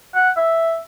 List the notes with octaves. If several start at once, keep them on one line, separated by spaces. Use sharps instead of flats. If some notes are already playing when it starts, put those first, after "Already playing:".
F#5
E5